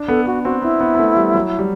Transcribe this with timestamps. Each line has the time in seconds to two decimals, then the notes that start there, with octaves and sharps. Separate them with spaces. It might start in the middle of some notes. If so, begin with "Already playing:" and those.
Already playing: D4
0.08 B3 A4
0.26 B3 F#4
0.45 C4 F#4
0.62 B3 E4
0.81 B3
0.95 B3
0.99 A3
1.17 G3
1.34 F#3
1.59 G3